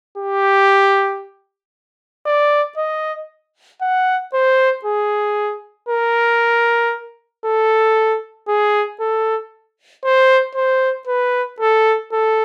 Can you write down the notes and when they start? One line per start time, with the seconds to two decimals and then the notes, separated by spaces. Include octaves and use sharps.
0.18 G4
2.26 D5
2.77 D#5
3.82 F#5
4.34 C5
4.85 G#4
5.89 A#4
7.45 A4
8.48 G#4
9.00 A4
10.05 C5
10.55 C5
11.07 B4
11.61 A4
12.12 A4